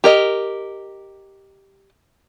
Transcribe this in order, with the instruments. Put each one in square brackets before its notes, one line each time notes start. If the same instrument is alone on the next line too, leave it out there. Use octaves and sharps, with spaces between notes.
[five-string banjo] G4 A#4 D#5